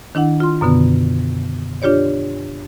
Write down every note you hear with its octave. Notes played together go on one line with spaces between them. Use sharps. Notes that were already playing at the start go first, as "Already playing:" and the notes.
D#3 D4 E4 F#5
F4 C6
F#2 B2 D3 B3
D4 F4 G4 C#5 D5